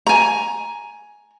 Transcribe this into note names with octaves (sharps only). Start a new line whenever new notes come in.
G#5 A#5